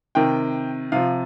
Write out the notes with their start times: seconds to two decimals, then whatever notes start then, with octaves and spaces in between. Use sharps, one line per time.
0.15 C3 D#3 G5
0.92 C3 F3 F5